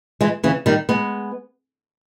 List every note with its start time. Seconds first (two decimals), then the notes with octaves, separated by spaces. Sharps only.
0.21 E3 G#3
0.44 C#3 E3
0.66 D#3 G3
0.89 G#3 B3